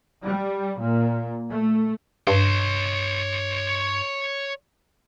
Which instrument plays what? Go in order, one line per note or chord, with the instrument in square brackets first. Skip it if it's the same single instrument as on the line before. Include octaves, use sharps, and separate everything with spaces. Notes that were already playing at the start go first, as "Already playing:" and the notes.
[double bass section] G3
A#2
A3
[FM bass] G2 [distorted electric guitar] C#5 C6